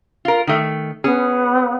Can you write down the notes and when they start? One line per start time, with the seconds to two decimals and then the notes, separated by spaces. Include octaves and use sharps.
0.25 F4 A#4
0.47 D#3 A3
1.04 B3 C#4 G#4